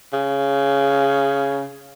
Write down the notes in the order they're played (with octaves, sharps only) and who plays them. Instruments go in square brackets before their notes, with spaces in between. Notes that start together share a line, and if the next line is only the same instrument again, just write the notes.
[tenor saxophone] C#3